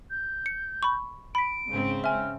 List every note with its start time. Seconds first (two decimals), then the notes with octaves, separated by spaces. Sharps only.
0.11 G6
0.46 C#7
0.83 B5 C#6
1.35 B5 B6 D7
1.69 G#2 C#3 C4
2.04 E5 G#5 F6